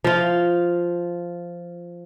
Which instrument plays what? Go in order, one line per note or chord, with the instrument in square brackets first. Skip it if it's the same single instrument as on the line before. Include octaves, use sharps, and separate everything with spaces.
[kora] F3 F4